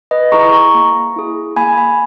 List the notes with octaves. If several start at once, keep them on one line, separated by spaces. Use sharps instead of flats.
B4 D#5
E4 G#4 A#5 C#6
A#5 C#6
A#3
E4 G#4
A#3 G#5 B5
G#5 B5